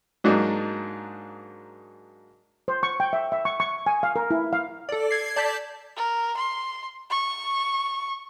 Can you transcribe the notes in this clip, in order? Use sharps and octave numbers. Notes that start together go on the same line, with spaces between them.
G#2 F#3 A#3 D4 D#4
C5
C#6
G5
E5
E5
C#6
C#6
G#5
F5
A#4
E4
F5
A4 D5
G#6 C7
D5 A5 G6 B6
A#4
C6
C#6